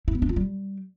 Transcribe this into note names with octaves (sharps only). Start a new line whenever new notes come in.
E4
B3
D4
F4
G3